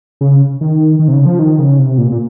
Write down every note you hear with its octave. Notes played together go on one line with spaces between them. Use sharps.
C#3
D#3
D#3
C3
C#3
F3
D#3
C#3
C3
A#2
A#2